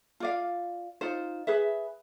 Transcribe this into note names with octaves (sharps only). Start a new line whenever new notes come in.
F4 D5 F5
D#4 F4 C5
G#4 B4 E5